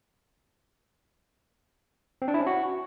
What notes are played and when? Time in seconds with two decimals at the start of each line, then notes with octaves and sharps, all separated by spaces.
2.22 C4
2.28 D4
2.34 E4
2.40 C#4
2.47 F#4